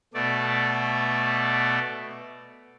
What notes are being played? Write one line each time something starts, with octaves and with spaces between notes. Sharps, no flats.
B2 A3 D5